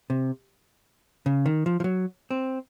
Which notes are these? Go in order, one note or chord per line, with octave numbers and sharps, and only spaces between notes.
C3
C#3
D#3
F3
F3
F#3
C4